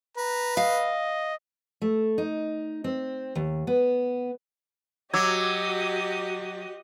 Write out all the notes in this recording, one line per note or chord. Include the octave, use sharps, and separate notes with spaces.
B4 A#5
D#5 F5
A3
D#4
C4
D#2
B3
F#3 F#4 G4 D#5 D6 E6 G#6